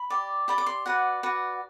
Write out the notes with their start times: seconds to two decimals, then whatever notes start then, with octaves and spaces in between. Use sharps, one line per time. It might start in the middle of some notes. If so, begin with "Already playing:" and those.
Already playing: B5
0.10 G4 D5
0.48 G4 D5 B5
0.58 D6
0.66 C6
0.86 F#4 B4 D5 F#5
1.23 F#4 B4 D5